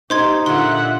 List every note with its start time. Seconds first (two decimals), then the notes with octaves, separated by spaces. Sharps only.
0.10 D#4 G4 C5 C6 G#6
0.46 A#2 D3 F4 E5 F#5 C6